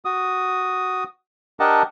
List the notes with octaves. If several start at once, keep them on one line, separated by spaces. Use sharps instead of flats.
F#4 D#6
D4 G4 A#4 D#5 F#5 A5